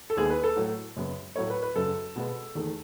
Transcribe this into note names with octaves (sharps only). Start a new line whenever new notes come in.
A4
D#2 D#3 G#3 B3 G#4
B4
A4
A2 F#3 A3
F#2 C#3 G#3 B3
A2 F#3 A3 C#5
B4
B4
F#2 C#3 F#3 A4
B2 G#3 B3
E2 D#3 A3